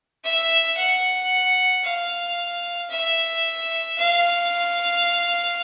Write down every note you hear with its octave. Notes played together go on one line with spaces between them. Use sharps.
E5
F#5
F5
E5
F5